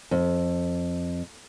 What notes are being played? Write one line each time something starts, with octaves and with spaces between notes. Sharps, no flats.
F2